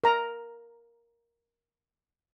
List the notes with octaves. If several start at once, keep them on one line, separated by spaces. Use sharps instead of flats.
A#4 A#5